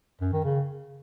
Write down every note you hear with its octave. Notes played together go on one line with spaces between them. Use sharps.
F#2
D#3
C#3